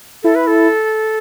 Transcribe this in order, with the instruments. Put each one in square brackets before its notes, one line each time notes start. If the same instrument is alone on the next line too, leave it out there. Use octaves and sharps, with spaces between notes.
[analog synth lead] E4 [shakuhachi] A4
[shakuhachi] B4
A4